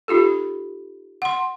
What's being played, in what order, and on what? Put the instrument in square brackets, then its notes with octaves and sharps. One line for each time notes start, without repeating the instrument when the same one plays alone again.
[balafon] D#4 F4 G4 A4
F#5 C6